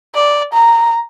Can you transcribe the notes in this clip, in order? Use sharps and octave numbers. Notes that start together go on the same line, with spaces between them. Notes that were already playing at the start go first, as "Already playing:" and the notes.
D5
A#5